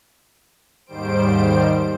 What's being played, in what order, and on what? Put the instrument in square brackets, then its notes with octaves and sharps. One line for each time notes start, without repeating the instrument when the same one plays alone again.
[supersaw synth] D#2 G#2 D#3 G3 C5 D7